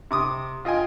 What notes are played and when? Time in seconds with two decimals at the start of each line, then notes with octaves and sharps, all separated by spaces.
0.11 C3 D6 D#6
0.65 F4 D#5 G5 G#5